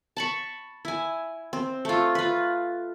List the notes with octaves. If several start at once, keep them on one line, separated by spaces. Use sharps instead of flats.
A5 B5 C#6
E4 G#5
C4
A3 F4
F4 B4